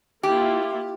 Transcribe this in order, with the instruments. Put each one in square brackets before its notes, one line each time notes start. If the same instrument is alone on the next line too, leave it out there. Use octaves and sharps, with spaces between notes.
[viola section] A#3 E4 F4 [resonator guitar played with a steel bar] G4